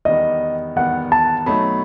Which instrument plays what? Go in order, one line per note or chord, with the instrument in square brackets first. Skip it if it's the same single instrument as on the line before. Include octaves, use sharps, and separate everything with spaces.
[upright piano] E2 D#3 G3 B3 [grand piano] D#5
[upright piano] E2 D#3 G3 B3 [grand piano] F#5
[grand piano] A5
[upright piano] B2 F#3 A3 D#4 [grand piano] B5